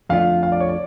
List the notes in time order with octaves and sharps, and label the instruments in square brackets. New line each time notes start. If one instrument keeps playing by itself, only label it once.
[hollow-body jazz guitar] F2 D3 F3 A3 F4 [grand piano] F5
[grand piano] F5
D5
C#5
D5